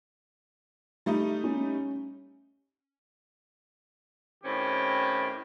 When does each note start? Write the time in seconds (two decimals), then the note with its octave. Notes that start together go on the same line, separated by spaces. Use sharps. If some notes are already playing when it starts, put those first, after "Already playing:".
1.06 G3 A3 D#4
1.44 C#4
4.43 A2 D#3 C4 C#4 G4